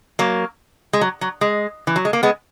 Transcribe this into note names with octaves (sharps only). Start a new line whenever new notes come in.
F#3 A#3
G#3
F#3
F#3
G#3
E3
F#3
G#3
A#3
G#3 B3